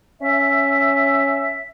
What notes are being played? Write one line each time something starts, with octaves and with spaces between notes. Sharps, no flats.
C#4 E5